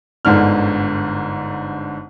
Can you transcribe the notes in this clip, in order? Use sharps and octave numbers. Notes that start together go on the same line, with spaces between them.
G1 G#2 D3 F6